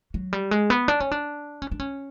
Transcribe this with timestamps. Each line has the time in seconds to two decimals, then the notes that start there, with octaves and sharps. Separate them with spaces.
0.14 F#3
0.33 G3
0.51 G#3
0.70 B3
0.88 D4
1.00 C#4
1.12 D4
1.62 C#4
1.71 D4
1.80 C#4